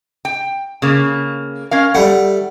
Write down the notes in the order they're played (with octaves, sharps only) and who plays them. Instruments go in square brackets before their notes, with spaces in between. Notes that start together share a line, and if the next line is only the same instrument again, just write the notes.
[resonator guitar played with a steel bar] G5
C#3 A#3
C#4 A#4 F5
[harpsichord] G3 A3 [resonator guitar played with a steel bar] F#5